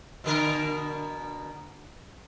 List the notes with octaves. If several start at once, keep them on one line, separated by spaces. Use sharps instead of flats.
B2 D3 A#4